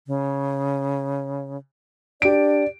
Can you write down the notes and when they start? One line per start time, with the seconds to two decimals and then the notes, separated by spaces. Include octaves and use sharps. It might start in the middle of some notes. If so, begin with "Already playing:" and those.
0.07 C#3
2.22 D4 G4 D5 D7